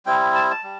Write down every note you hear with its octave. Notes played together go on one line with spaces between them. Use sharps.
G3 C4 E4 G5
A5
A5
G3